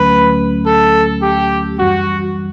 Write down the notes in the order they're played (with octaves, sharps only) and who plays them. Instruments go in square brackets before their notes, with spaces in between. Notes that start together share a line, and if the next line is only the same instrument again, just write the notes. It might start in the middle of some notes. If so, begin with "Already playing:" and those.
Already playing: [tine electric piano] D2 D3 F#3 A3 C#4 [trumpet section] B4
[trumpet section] A4
G4
[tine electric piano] F#2 E3 G3 [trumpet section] F#4